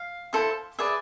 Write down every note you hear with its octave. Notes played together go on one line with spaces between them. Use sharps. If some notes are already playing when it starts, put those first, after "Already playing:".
Already playing: F5
E4 A4 C5
G#4 B4 D5 E5